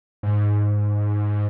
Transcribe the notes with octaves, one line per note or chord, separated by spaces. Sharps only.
G#2